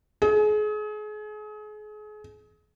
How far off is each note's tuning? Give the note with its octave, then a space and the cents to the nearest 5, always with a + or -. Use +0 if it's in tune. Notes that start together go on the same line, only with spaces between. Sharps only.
G#4 +35